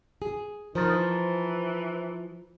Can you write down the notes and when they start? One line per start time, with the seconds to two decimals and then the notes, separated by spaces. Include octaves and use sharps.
0.22 G#4
0.75 D#3 F3 C5 A#5 A6
0.91 E3